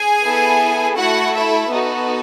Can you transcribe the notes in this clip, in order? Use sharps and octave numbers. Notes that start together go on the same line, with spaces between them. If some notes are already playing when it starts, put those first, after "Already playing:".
Already playing: G#4 G#5
B3 E4 A4
A3 E4 F#4 A4 F#5
E4 E5
B3 D#4 F#4 A4